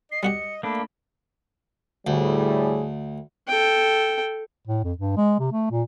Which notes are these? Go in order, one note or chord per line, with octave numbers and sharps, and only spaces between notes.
D#5 C7
G3 F#4 G4 C#7
A3 A#3 D4 B5
D2 A2 G3 G#4
A4 G5
A2
F2
G2
G#3
C3
A3
A#2